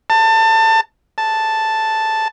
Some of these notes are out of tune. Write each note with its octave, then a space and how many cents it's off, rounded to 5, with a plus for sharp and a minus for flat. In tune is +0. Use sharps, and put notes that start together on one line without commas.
A5 +25
A5 +0